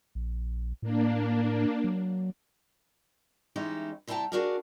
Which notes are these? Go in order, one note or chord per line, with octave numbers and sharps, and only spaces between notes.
A#1
A2 A#3 D4
F#3
E3 G#3 C#4 D#4 E4 G4
C3 G3 E4 G5 A5 A#5
D4 F#4 G#4 A#4 D5 F5